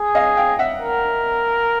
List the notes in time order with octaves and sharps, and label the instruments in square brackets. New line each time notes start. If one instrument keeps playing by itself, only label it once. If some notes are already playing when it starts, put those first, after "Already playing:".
Already playing: [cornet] G#4
[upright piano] D#5 F5
F5 G5
E5 F#5
[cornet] A#4